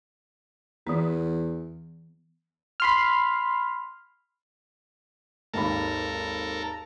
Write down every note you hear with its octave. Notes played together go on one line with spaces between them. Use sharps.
E2 E3 B3
B5 C6 F6
G#1 D#2 A4 A#4 B5